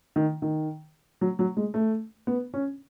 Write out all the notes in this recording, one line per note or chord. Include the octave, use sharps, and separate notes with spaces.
D#3
D#3
F#3
F#3
G#3
A3
B3
C#4